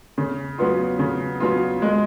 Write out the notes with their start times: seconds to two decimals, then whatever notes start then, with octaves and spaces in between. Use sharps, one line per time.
0.18 C#3
0.58 F#3 B3 F4
0.99 C#3
1.40 F#3 B3 F4
1.82 G#3